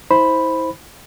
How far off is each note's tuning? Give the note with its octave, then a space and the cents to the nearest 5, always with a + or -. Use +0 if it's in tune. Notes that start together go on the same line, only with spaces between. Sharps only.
E4 -30 C5 +0 B5 +0